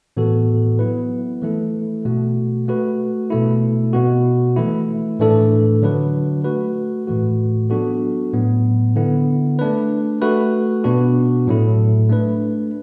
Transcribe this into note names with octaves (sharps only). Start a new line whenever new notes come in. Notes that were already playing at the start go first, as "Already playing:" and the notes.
A2 E3 B3 F#4 A4
F#3 B3 E4 B4
E3 A3 E4 A4
B2 A3 F#4
A3 F#4 B4
B2 A3 E4
B2 B3 F#4
E3 A3 E4
A2 E3 A3 D4 A4
D3 F#3 D4 F#4 B4
A3 F#4 B4
A2 E3 A3 F#4
F#3 B3 D4 F#4 A4
A2 F#3 B3
D3 B3 E4
A3 D4 B4
A3 F#4 B4
B2 B3 D4 F#4
A2 F#3 A3 E4 A4
A3 D4 B4